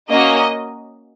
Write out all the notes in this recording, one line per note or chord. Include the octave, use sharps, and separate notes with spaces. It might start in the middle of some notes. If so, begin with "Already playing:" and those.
A#3 C#4 F#4 D#5